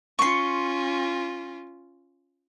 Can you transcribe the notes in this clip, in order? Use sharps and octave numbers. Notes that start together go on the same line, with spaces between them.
C#4 F4 C6 C#6